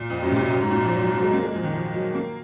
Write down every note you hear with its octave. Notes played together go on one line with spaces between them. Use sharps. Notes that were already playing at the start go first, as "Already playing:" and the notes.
Already playing: A#2
F2
F#2
C3
A#2
F#2
G#2
A#2
F3
F#3
F#3
F#3
G#3
A#3
G#3
F3
D#3
F3
F#3
A#3